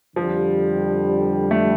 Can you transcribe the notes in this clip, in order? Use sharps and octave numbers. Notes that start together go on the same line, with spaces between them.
F2 D3 F3 G3
A3